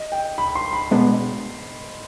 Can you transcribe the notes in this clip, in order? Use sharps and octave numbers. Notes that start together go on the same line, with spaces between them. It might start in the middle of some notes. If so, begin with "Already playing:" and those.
Already playing: D#5
G5
B5
C6
B5
B2 G#3 B3 D4